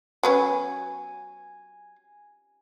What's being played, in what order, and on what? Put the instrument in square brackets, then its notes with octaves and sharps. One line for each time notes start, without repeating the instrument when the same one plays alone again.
[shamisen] F#3 B3 C#4 [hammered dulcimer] G#5